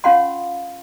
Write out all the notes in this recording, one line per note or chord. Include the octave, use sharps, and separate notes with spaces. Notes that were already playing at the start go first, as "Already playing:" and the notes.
C#4 F4 F5 F#5 C6